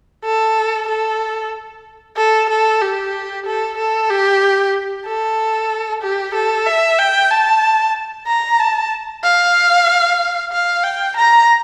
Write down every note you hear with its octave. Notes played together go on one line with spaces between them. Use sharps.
A4
A4
A4
A4
G4
A4
A4
G4
A4
G4
A4
E5
G5
A5
A#5
A5
F5
F5
G5
A#5